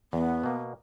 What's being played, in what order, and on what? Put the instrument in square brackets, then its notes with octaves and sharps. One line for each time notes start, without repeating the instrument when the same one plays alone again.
[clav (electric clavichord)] E2 [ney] B3
[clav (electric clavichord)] B2 A#3